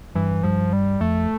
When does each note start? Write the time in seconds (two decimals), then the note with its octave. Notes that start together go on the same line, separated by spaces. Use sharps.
0.15 G2 E3
0.43 G2 F3
0.73 G3
1.01 F2 A3